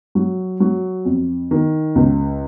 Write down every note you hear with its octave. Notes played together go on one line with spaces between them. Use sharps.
F#3
F#3
F2
D#3
C#2